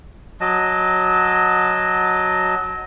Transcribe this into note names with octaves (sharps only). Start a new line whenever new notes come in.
F#3 D#5 A5